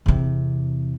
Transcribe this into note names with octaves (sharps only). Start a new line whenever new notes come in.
E2 C3